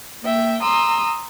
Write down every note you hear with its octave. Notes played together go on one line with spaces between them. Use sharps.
A#3 E5 G5
A#5 C6 D#6 E6